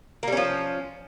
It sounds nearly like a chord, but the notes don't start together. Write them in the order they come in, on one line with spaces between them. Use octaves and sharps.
A#3 G3 C#4 F3